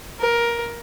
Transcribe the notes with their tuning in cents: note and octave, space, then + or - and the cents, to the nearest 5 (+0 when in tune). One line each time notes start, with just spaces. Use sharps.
A#4 +15